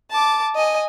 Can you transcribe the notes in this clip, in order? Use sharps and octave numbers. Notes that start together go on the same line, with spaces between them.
A5 D6
D#5 G#5